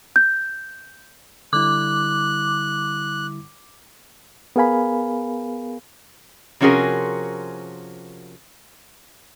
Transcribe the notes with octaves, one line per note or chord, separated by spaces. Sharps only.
G6
D3 G3 E4 D6 F#6
B3 G#4 A#4 F5 G#5 B5
C3 F3 C#4 F#4 G#4 A#4